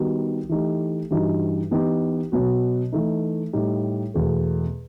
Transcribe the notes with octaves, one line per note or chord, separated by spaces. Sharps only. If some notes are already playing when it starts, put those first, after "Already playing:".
Already playing: D#3 G3 B3 D#4 F#4
E3 A3 D#4 G4
G2 E3 G3 D#4 F#4
E3 B3 D#4 G4
B2 F#3 B3 F#4
E3 A3 D#4
A2 G3 D#4
E2 B2 A3